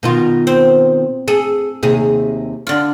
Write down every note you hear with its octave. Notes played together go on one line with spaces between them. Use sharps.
B2 D#3 F4
C4 C5
G#4 A4
D#2 C3 G#4
D3 F4